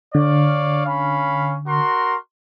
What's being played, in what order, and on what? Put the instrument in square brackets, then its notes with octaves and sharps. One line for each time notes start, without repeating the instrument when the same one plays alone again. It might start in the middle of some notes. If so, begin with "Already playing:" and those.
[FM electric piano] D3 [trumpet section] C#5 D5 F5
[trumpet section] C#4 F5 B5
F#4 A#4 C6